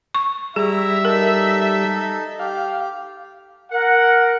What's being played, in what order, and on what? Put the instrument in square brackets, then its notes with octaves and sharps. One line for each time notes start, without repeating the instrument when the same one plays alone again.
[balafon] C#6
[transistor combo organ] G3 [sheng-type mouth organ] E4 A#5 [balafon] G#4 [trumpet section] E5
[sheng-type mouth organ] D#4 A4 [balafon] A#4
[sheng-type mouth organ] G4 [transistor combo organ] F5
[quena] A#4 [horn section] F#5